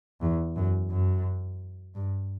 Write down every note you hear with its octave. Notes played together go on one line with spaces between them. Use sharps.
E2
F#2
F#2
G2